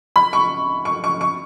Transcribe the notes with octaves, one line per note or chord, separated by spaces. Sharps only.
B5
C#6
C#6
C#6
C#6